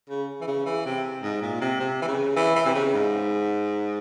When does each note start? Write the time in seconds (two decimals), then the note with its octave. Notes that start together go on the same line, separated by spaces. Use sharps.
0.10 C#3
0.41 E3
0.47 C#3
0.66 E3
0.85 C3
1.23 G#2
1.42 A#2
1.61 C3
1.80 C3
2.02 E3
2.08 C#3
2.36 E3
2.56 E3
2.65 C3
2.75 C#3
2.93 G#2